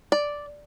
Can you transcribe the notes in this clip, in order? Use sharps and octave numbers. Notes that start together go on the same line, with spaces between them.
D5